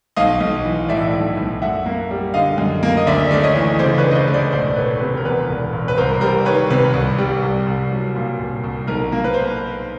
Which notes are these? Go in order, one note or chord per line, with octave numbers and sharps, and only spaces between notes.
B1 D#5 F5
B1
E3
A2 D5 E5
B1
B1
F#2 E5 F#5
A#3
G3
D3 D#5 F5
F#2
A#3
D#5
D2 D5 E5
A3 D5
C#5 D#5
E3
C#3 C5 D5
B4 C#5
D2
D#5
C5 D5
A3
C5 D5
E1 C5 D5
E1 B4 C#5
C3 B4
A#4
E2 B4
E1
E1
B4
C2 A#4 C5
G3 A#4 C5
D#3 B4 C#5
C3 B4
C2
G3
C2
C2
F#3
A#2
C2
C2
B1 A#4
A#3
B4
C5